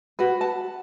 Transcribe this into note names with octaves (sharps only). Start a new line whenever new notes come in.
F#4 B4
A5